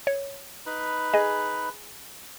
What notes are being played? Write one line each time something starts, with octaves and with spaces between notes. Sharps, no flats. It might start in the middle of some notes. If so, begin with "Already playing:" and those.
C#5
D#4 B4 B5
G#4 D#5